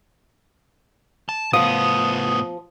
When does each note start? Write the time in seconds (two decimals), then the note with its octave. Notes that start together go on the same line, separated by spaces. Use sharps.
1.29 A5
1.53 A2 F3 B3 D#6